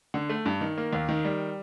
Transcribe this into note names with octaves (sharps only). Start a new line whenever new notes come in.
D3
A3
G2
D#3
A#3
D#2
D#3
G3